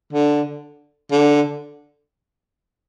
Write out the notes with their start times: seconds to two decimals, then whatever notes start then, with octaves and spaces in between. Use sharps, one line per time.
0.13 D3
1.12 D3